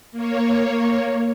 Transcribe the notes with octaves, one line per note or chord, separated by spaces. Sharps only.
A#3 C#5